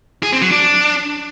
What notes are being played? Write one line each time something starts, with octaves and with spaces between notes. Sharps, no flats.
G#4
C4
F#3
D4